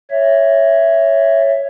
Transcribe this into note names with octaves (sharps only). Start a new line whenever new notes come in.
C#5 E5